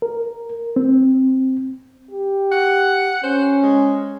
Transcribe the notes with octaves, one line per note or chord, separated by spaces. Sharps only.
A#4
C4
G4
F#5
C#4 C5
G#3